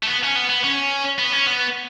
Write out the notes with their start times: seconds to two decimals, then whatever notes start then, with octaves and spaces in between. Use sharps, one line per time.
0.03 A3
0.07 B3
0.24 C#4
0.36 B3
0.49 B3
0.63 C#4
1.18 B3
1.32 C#4
1.46 B3